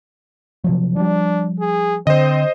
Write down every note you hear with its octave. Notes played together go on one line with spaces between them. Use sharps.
C3 F3 F#3
F3 G3 D4
G#4
D3 C4 C5 D#5